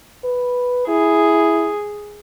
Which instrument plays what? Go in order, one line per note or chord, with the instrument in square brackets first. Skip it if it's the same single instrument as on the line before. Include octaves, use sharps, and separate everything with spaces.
[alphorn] B4
[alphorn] E4 [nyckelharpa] G#4